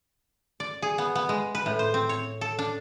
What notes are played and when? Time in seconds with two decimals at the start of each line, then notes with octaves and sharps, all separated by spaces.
0.60 D5
0.82 G#4
0.98 B3
1.15 B3
1.29 G#3
1.55 B4
1.66 A2
1.79 C5
1.94 C4
2.09 C#5
2.41 A4
2.59 D4